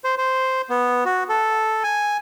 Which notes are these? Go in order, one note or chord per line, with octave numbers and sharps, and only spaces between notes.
C5
C5
B3
F#4
A4
G#5